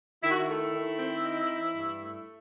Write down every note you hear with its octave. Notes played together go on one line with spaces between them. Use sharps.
D#3 E4
F#4
E4
A3
D#3
C4
D#4
E3
G2
A3